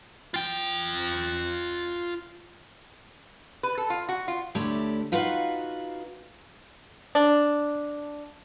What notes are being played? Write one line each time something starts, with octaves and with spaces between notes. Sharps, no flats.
F4 G5
B4
A4
F4
F#4
F4
D2 A3 E4 G4 C#5 D5
D#4 F4 F#4 B4 F5 F#5
D4